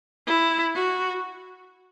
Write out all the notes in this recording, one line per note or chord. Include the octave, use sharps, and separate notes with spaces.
E4
F#4